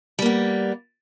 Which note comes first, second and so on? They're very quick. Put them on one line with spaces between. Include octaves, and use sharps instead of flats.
G3 A#3 B3